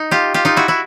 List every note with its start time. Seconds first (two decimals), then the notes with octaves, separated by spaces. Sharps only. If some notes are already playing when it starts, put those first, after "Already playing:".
Already playing: D#4
0.11 F4 G4
0.34 F4 G4
0.45 D#4 F4
0.57 E4 F#4
0.68 E4 F#4